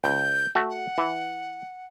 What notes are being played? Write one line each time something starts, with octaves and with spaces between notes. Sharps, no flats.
C#2 G6
A3 F#4
F#5
E3